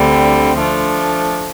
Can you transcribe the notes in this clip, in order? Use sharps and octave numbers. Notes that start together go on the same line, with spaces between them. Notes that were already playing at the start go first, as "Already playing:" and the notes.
Already playing: D2 D3 G3 C4
F3 A3 D4